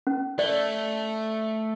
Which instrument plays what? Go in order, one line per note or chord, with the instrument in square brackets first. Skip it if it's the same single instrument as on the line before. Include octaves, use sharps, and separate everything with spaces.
[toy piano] C#4
[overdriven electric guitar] A3 [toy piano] D5